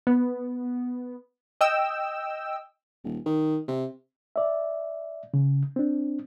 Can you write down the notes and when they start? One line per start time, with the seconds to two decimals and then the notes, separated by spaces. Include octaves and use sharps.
0.07 B3
1.61 D#5 G5 E6
3.04 D#1
3.26 D#3
3.68 C3
4.36 D5 E5
5.34 C#3
5.76 C4 D4